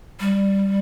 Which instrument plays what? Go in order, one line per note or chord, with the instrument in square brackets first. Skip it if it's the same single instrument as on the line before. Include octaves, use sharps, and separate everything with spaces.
[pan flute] G3